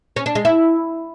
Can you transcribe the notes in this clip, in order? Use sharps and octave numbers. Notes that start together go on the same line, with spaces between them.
C#4
D4
G#3
E4